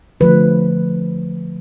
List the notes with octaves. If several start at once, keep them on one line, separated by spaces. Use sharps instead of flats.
D3 F3 A3 B4